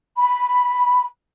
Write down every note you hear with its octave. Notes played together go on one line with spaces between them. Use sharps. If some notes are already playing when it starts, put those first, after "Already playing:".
B5